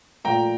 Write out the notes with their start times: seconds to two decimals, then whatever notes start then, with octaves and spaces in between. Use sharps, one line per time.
0.24 A#2 F3 A3 G5 A#5